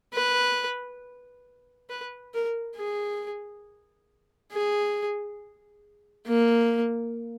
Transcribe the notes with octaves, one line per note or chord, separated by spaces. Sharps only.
B4
B4
A#4
G#4
G#4
A#3